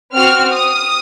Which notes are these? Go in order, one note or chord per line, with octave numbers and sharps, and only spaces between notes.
C4 F#4 F6
D#6